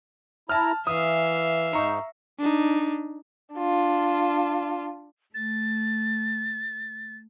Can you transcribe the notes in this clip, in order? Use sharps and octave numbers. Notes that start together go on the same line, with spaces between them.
E4 A5 A#5 F6
E3 E5 F5 D#6
G#2 D#4 A#5 C#6
D4 D#4
D4 F4
A3 A6